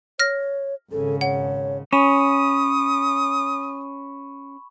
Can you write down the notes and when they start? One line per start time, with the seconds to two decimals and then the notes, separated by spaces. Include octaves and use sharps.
0.19 C#5 F6 A#6
0.92 G#1 C#3 A4
1.21 C#5 F#5
1.93 C#4 B5 C#6 D#6 E7